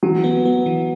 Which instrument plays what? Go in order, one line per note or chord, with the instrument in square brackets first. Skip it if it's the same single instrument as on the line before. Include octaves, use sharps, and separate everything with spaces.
[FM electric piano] E3 [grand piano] F#3
[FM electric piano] B3
B3
E3